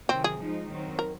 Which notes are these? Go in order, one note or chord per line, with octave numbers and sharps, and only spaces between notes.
C3 D#3 F#3 C4
G#4
F3 G#3 D#4
D#3 F#3 C4
A#4